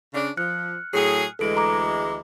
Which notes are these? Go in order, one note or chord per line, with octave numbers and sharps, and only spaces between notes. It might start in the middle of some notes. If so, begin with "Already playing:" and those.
C#3 D4
F3 F6 F#6 C#7
A2 F#3 G#4
D2 E3 G#3 A4 D7
A#5 D6